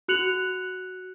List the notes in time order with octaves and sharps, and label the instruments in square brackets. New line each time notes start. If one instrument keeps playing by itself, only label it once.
[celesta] F#4 F#6 C#7 F7 F#7